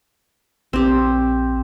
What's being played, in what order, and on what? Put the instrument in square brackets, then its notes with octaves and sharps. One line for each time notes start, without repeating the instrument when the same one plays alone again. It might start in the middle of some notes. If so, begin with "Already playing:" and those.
[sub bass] A#1 [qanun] C4 G4